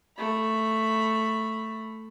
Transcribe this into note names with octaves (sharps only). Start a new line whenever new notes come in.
A3 B5